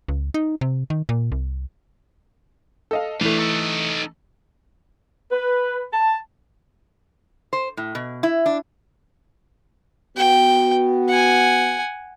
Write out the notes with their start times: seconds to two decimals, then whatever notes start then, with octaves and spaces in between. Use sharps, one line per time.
0.08 C#2
0.34 D#4
0.61 C3
0.90 D#3
1.09 A#2
1.32 C2
2.91 A4 D#5 F5
3.21 E3 A3 D4 F5
3.39 D#4 A4
5.31 B4
5.93 A5
7.53 C5
7.77 A2
7.95 B2
8.23 E4
8.46 D4
10.17 B3 F#4 G5
11.09 F#5 G#5